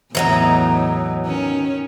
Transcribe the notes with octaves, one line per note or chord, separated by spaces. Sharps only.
E2 A2 E3 F#3 D#4
D#3 C#4